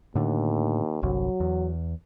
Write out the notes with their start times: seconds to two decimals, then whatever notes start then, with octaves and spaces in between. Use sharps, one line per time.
0.15 D#2 A2 D3
1.03 G1 C2 F#3
1.40 E2